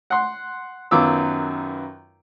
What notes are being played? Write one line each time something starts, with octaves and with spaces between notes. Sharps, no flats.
F#5 C6
F#2 D#3 B3 F4 D6 E6